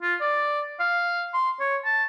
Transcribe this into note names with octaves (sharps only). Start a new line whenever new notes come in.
F4
D5
F5
C6
C#5
A5